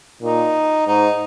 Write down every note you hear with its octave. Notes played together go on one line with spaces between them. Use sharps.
A#2 D#4
G#2 D#4